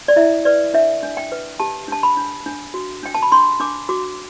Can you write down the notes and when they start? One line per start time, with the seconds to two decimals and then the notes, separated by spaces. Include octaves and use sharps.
0.08 D5
0.16 E4 E5
0.45 B4 D5
0.74 D4 E5
1.03 D4
1.17 G5
1.32 B4
1.60 G4 A5
1.88 D4 A5
2.03 B5
2.17 D4
2.46 D4
2.74 F#4
3.03 D4 G5
3.14 A5
3.22 B5
3.32 D4 C6
3.60 D4 D6
3.89 F#4 D6